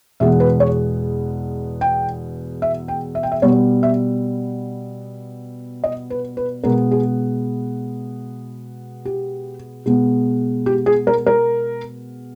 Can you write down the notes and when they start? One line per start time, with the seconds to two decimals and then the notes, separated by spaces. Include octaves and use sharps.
0.20 E2 B2 G#3 B3 E5
0.40 B4
0.60 C#5
1.81 G5
2.62 E5
2.88 G5
3.15 E5
3.23 G5
3.32 E5
3.42 B2 G3 B3 C#5
3.83 E5
5.84 D#5
6.10 B4
6.37 B4
6.63 B2 G#3 B3 A#4
6.91 G#4
9.05 G4
9.86 B2 G#3 B3
10.66 G4
10.86 G#4
11.07 A#4
11.26 A#4